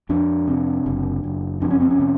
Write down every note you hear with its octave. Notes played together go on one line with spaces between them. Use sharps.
F2 D4
C3
F#1
F#1
F2 D4
C#4
C4
C#4
C3